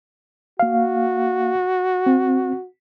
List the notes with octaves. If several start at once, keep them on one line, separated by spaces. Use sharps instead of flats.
A#3 F#4 F5
C4